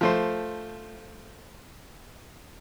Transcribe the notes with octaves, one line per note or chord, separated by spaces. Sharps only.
F3 A3 C5